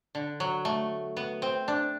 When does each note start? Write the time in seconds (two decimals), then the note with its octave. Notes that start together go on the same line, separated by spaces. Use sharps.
0.15 D3
0.40 F#3
0.65 A3
1.17 B3
1.42 C4
1.68 D4